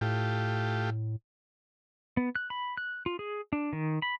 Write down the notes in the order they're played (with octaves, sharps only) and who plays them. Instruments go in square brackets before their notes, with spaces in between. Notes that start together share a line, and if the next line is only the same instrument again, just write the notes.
[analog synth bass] A2 [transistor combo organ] A3 F4 G4
[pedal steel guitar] B3
F#6
B5
F#6
F4
G#4
D4
D#3
B5